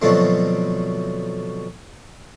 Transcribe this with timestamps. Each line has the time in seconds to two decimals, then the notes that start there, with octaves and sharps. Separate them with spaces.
0.02 B2 D3 F3 F#3 A3 C4